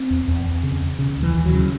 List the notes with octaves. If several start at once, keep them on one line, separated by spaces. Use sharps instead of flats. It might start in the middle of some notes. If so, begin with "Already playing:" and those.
Already playing: C4
E2
E2
E2
C#3
E2
C#3
D#2
E3
D#2
F#3
C#3